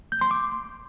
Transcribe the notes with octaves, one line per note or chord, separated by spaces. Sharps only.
G6
C6
D6